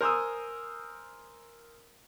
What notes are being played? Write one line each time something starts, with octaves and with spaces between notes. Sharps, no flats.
A#4 C5 G#5 D#6 E6